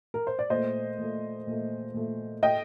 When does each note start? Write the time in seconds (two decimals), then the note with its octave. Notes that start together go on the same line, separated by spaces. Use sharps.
0.14 A#4
0.27 C5
0.39 D5
0.50 A#2 A3 C5 D#5
0.98 A#2 A3
1.47 A#2 A3
1.94 A#2 A3
2.42 A2 A3 D#5 G5